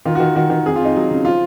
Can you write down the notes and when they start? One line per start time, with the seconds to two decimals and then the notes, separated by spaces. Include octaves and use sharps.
0.05 D#3 F4
0.15 F#4
0.20 D#3
0.35 D#3 F#4
0.50 D#3
0.65 F2 G#4
0.76 F4
0.80 F2
0.85 D#4
0.96 F#3
1.11 C#3
1.25 F3 F4